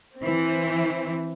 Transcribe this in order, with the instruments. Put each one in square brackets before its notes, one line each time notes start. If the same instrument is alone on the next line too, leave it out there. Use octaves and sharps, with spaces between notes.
[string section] E3 C4